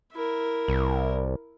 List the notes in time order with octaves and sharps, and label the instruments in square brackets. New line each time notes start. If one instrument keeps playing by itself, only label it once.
[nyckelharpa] E4 A#4
[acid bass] C2